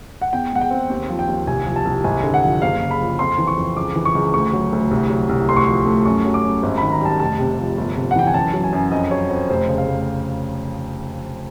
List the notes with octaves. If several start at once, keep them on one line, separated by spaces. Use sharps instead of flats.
F#5
E2 G5
G#3 F#5
G5
C4
D#2
F3
G5
D#2
C2 G#5
F3
A5
C2
G#1 G#5
D3
F#5
F3
F#1 F5
C#3
B5
F3
F2 C6
E3
C#6
F2
C#2 D6
E3
C#6
C#2
D2 C#6
F#3
D2
C2
F#3
C2
D2 C6
C#6
F3 C6
A3
F#2 C#6
F#3
D6
F#2
G#1
D#3 B5
A#5
G3 A5
F1 A5
C3
F3
G1
C3
F#5
E3 G5
G#5
F#2 A5
F#3
G#5
F#2
F2 D#5
F#3 C#5
F2 C5
F1 C5
C#3
F5
F1